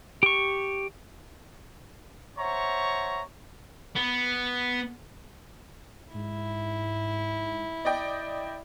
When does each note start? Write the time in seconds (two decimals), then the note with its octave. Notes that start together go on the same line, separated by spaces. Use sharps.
0.23 G4 C#6
2.38 C5 C#5 E5 F#5 A#5 C#6
3.96 B3
6.14 G#2 E4
7.85 D5 D#5 G5